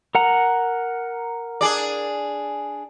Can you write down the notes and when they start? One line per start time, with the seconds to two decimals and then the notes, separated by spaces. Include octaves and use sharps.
0.15 A#4 F#5 A#5
1.61 D4 G#4 D5